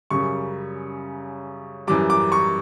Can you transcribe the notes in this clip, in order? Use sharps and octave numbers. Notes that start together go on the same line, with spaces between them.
F#2 C#3 G3 C#6
F#2 E3 G3 D6
D6
C#6